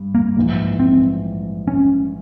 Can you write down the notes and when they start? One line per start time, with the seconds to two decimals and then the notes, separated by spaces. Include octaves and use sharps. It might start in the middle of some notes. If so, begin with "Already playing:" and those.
Already playing: G2
0.15 A#3
0.36 A#1 G#2 E3
0.79 C4
1.68 C#4